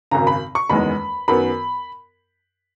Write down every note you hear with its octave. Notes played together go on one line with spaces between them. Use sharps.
G#1 F#2 C#3 A#5
B5
C#6
F#1 E2 D#3 G#3 B5
F#2 D#3 F#3 B3 B5